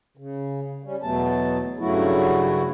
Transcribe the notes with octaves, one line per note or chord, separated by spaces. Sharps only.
C#3
G3 C#4
E2 B2 F#3 A3 B3 A5
G2 C#3 F#3 A3 E4 F#4